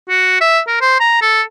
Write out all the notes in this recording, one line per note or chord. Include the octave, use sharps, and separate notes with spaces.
F#4
E5
A#4
C5
A#5
A4